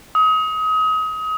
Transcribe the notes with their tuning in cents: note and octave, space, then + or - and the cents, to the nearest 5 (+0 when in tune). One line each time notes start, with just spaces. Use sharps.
D#6 +30